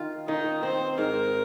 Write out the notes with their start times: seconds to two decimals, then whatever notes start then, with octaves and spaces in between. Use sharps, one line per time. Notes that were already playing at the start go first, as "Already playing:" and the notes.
Already playing: D#3 F4
0.27 D#3 D#4
0.63 C4 C5
0.98 G#2 A#4